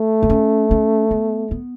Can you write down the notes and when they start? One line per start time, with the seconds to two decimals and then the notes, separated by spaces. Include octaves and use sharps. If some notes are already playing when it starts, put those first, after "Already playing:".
Already playing: A3
0.23 B3
0.30 C#4
0.71 C#4
1.11 B3
1.51 B3